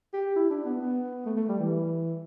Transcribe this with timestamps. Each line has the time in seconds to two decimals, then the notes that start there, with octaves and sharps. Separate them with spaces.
0.13 G4
0.36 E4
0.50 D4
0.65 B3
0.81 B3
1.26 A3
1.37 A3
1.49 G3
1.59 E3